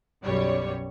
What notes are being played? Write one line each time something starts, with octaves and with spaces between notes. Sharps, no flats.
B1 F#2 G3 C#5